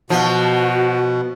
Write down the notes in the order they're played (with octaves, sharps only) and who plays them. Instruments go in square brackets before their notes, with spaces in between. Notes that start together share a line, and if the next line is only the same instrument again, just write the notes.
[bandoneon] B2 [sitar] F3 [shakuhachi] F#4